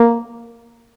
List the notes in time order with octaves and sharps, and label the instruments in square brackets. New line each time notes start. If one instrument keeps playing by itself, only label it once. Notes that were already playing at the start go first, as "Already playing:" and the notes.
Already playing: [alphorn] A#3